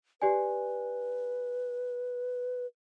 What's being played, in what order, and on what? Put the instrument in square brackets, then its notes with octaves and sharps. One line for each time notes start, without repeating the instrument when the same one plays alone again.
[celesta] G4 D5 G#5 [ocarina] B4